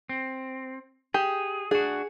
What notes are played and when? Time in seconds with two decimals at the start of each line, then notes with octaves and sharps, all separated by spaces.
0.09 C4
1.14 G4 G#4
1.71 D4 F#4 G#4